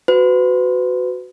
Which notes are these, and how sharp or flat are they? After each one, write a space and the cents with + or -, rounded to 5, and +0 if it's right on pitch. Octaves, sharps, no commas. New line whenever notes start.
F#4 +0 B4 +30